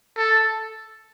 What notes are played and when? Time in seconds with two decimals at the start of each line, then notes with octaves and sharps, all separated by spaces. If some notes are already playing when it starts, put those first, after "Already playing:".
0.17 A4